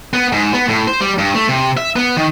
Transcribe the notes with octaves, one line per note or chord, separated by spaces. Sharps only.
B3
G#2
B3
A2
C5
G3
G2
A3
C3
E5
B3
D#3